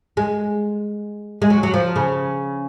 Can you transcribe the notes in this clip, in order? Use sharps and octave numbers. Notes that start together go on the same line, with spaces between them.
G#3
G#3
F#3
F#3
F3
C#3